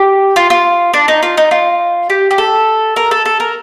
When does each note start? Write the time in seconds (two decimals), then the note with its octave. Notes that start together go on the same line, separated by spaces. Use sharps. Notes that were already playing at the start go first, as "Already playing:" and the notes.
Already playing: G4
0.36 F4
0.50 F4
0.94 D4
1.08 D#4
1.23 F4
1.37 D#4
1.51 F4
2.10 G4
2.31 G4
2.38 A4
2.96 A#4
3.11 A4
3.25 A4
3.40 A#4